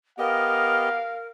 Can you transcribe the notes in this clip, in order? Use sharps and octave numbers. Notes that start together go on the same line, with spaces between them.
B3 G4 A#4 D#5 F5